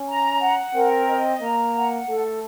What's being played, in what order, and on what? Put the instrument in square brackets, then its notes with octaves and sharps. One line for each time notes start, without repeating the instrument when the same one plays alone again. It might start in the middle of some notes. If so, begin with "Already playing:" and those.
Already playing: [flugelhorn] C#4
[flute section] A#5
F#5
[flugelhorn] C4 [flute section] A#4
[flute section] D#5
[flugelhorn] A#3 [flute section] A#5
[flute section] F#5
[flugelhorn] A3 [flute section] A4